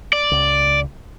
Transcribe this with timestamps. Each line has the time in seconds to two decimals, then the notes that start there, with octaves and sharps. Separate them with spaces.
0.13 D5
0.31 C#2